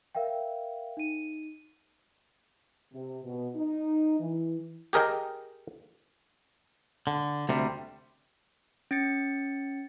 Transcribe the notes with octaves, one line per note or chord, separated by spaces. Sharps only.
A#4 E5 F5 G5
D#4 D#7
C3
B2
D#4
E3
G4 G#4 A#4 D#5 G5
D3
D2 C3 G3
C#4 A6 C#7